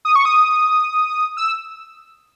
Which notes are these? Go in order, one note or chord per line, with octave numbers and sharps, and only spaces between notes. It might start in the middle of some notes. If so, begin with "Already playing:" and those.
D#6
C#6
D#6
E6